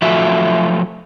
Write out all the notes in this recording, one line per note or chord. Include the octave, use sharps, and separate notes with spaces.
F3 F#3 A3 F4 F#4 E5